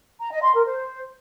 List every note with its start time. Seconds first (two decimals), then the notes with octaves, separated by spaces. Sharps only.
0.19 A#5
0.31 D#5
0.42 C6
0.54 A#4
0.65 C5